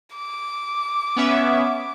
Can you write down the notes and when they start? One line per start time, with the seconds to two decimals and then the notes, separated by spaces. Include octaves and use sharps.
0.16 D6
1.16 B3 C#4 E5